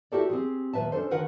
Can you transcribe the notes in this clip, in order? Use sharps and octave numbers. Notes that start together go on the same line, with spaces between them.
E4 F#4 G4 A4 A#4 D5
C4 G4 G#4
D#2 A#2 D#3 B4 E5 A5
C#4 D4 A4 C5
D3 D#3 A3 A#4 B4 F#5